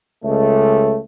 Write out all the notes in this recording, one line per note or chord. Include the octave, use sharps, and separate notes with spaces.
C#2 A3